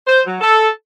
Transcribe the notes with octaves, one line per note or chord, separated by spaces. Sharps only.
C5
F#3
A4